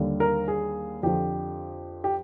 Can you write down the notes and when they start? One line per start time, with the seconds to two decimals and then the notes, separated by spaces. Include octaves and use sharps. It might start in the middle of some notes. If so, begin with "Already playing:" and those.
Already playing: D#2 D3 G3
0.20 A#4
0.48 G#4
1.03 F2 D3 F3 G4
2.04 G4